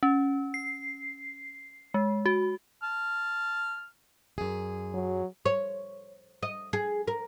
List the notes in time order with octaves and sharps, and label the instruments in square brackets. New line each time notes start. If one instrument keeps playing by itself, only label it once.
[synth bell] C#4
C7
G#3
F#4
[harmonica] A5 F6
[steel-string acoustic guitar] F#2 G#4
[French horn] F#3
[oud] C#5
D#5
G#4
A#4